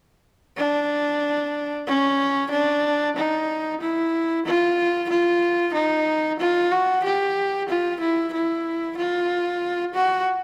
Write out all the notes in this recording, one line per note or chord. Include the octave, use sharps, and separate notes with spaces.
D4
C#4
D4
D#4
E4
F4
F4
D#4
F4
F#4
G4
F4
E4
E4
F4
F#4